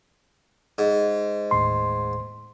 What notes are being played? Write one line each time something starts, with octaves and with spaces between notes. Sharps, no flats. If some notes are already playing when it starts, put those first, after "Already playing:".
G#2
D#2 A2 C6